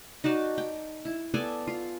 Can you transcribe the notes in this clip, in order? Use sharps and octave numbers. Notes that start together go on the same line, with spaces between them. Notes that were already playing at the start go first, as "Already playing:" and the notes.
D#4 F#4 D5 A5
G5
E4
B3 A4 D5 G#5
F4